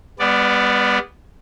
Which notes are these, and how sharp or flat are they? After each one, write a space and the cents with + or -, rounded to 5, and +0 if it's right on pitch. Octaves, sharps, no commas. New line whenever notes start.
G3 +45 B3 +0 D5 +0